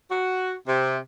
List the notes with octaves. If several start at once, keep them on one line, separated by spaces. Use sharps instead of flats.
F#4
C3